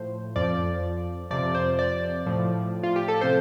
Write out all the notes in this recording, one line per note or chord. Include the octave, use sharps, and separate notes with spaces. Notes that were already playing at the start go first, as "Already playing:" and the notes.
Already playing: A2 F3 C5
F2 F3 D5
F2 C3 F3 D5
C5
D5
A2 F3
F4
G4
A4
C3 F3 C5